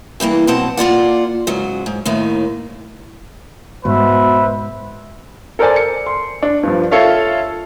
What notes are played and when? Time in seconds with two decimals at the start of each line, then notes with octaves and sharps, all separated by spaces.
0.20 E2 G2 E3 A#3
0.47 B2 F#3 C4 F#5 A5
0.77 A#3 F4 D5 F#5
1.47 G#2 C#3 F#3
1.86 G#2
2.05 D#2 A2 D#3
3.85 G#2 B2 G#3 B4 C5 E5
5.59 A4 A#4 C5 D5 G#5 A5
5.76 C#7
6.06 C6
6.43 D4
6.63 G2 F3
6.91 F4 A4 C#5 E5 F5